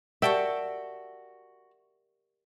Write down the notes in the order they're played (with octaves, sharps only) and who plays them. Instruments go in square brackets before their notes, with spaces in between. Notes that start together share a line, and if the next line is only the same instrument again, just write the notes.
[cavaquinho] F#4 A5 C#6 [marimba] G4 A#4 D5 [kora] E5 G5